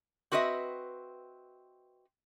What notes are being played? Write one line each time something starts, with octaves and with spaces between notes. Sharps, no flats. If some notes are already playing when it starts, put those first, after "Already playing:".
C4 F#4 B4 C5 D#5 E5